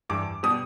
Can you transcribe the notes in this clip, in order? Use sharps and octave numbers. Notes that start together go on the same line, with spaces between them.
G2 E3 G3 D6
B2 G3 D#6